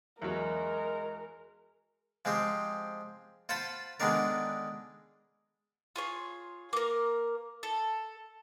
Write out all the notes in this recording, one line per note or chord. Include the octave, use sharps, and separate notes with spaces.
E2 F#3 G#3 A#4
F3 G#3 C4 G4
F4 C5 F#5 A5 B5
D3 D#3 G#3 B3 D4 A#4
F4 G#4 C#5
A#3 A#4
A4